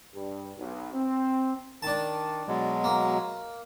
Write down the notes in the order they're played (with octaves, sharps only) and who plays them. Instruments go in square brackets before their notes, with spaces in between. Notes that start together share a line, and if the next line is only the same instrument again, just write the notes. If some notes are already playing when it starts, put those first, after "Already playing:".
[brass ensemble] G2
B1
C4
[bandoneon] D#3 [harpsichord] D4 A5
[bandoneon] B2 F#3 G#3
[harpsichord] A#3